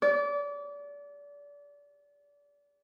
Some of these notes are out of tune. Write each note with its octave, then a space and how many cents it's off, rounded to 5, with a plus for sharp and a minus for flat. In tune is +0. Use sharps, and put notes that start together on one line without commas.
D5 -30